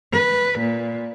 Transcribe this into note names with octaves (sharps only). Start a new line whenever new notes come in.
B4
A#2